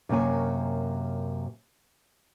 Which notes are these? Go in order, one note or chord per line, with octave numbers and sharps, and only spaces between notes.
F#2 C3 A#3 C#5 G#5